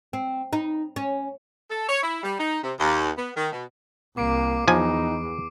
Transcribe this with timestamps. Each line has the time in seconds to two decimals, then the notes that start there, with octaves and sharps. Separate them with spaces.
0.13 C4
0.53 D#4
0.96 C#4
1.70 A4
1.89 C#5
2.03 E4
2.24 G3
2.38 D#4
2.64 C3
2.79 D#2
3.17 B3
3.36 D#3
3.52 B2
4.17 C2 A#3 D6 C7 D7
4.68 E2 F3 D#4 G#5